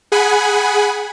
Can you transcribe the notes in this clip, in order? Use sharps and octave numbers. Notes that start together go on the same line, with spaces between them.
G#4 F#5 G#5 B5